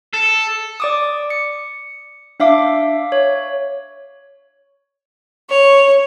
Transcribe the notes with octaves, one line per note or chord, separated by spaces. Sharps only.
A4
D5 D6 D#6
C#7
D4 E5 F5 D6
C#5
C#5